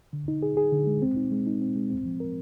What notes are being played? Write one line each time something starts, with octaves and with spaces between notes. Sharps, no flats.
D3
D#4
G#4
G#4
D3
G#3
C4
D#4
G#3
D#4
C4
G#3
C4
F3
A#4